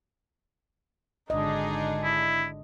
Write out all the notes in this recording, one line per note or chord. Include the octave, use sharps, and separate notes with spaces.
G#1 D3 D4 D#4 G#4 D#5
E4